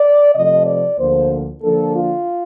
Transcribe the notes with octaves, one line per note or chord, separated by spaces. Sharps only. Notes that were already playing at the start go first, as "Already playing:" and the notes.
Already playing: D5
C3 F3 A3 D#5
D5
D2 D3 F3 A#3 C5
D3 F3 A#3 D4 A4
F4